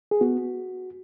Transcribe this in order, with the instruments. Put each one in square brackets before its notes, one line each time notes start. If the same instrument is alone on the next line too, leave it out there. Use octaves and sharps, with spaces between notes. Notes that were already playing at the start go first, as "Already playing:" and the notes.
[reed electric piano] G#4
B3 F#4